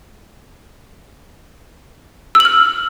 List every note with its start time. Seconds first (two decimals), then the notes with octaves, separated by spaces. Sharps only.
2.35 E6
2.40 F#7
2.45 F6